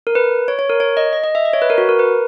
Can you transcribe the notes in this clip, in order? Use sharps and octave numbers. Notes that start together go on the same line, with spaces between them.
A#4
B4
C#5
C#5
A#4
C#5
D#5
D#5
D#5
E5
D#5
C#5
B4
A#4
F#4
A#4
B4